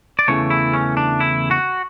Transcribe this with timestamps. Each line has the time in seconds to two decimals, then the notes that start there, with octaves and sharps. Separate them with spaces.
0.19 D5
0.28 E2 C#3 E3 A3 C#5
0.50 E4
0.73 C#4
0.97 D4
1.20 E4
1.51 F#4